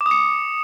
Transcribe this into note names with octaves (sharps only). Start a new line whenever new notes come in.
D6
D#6
C#7